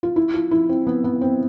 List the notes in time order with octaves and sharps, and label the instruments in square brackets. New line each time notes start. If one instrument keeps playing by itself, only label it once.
[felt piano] F4
E4
F4
E4
C4
B3
B3
C4